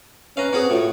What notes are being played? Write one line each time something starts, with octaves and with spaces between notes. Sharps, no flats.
C#4 B4 F5 A#5
C4 C#4 F#4 G#4
A2 F4 F#4